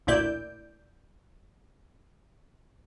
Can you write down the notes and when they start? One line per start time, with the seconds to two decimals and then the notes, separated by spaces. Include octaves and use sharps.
0.07 A1 D2 A#2 E4 D5 G6